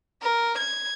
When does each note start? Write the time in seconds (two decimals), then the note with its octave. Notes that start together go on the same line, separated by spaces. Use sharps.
0.22 A#4
0.58 G#6